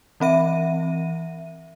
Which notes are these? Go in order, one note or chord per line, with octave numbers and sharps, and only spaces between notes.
E3 C4 E5 D#7